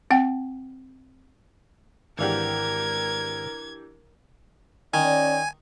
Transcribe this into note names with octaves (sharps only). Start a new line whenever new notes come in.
C4 F#5 G5
G#1 E3 D4 G4 A#4 F5 F#5 G#6
D#3 C#4 D5 G#5